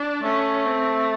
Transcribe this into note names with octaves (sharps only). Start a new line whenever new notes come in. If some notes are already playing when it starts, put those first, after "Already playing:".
Already playing: D4
A3 C#4
C4